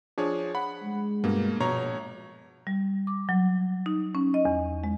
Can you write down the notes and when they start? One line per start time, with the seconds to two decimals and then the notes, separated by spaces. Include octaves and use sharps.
0.18 F3 D4 G#4 C#5
0.55 F#5 B5
0.83 G#3
1.24 G2 B2 A#3
1.60 A#1 B2 C#5 A#5
2.67 G3
3.07 D6
3.29 F#3
3.86 D#4
4.15 C#4
4.34 D#5
4.45 E2
4.84 G#3